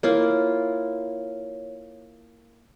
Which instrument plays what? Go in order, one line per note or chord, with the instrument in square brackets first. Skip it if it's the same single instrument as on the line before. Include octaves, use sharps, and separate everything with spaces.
[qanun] A#3 E4 F4 [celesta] C#5